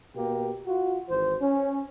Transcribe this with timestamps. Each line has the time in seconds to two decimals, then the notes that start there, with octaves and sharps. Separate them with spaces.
0.14 B2 A#3 G4
0.67 F4 F#4
1.08 G#1 E3 C5
1.40 C#4